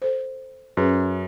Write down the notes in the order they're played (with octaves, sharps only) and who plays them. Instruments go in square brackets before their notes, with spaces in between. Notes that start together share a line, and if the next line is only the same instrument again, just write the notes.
[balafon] A4 C5
[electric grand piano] F#2 [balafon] C#4 G#4 B4